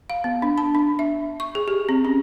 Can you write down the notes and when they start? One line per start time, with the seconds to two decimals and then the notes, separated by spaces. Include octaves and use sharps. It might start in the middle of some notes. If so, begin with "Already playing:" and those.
0.10 F5
0.24 B3
0.42 D4
0.58 A5
0.75 D4
0.99 E5
1.40 C#6
1.55 G#4
1.68 G4
1.89 C4
2.05 C#4